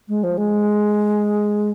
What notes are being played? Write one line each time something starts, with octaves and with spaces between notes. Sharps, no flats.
G#3
F3
G#3